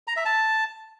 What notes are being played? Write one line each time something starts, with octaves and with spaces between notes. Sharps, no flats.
A#5
E5
A5